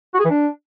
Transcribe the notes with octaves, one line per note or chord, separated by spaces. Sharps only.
F#4
G#4
E3
D4